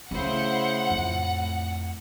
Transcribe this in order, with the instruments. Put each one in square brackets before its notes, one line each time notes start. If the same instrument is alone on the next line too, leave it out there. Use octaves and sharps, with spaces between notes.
[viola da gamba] C#3 E4 C5 [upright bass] A3 [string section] F#5
[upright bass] F2 [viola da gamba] A2